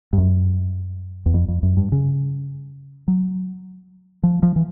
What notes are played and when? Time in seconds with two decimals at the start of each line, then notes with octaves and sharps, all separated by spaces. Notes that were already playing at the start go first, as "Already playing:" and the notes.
0.13 G2
0.18 F#2
1.26 E2
1.34 F2
1.48 F2
1.63 F#2
1.77 G2
1.92 C#3
3.08 F#3
4.23 F3
4.43 F3
4.56 E3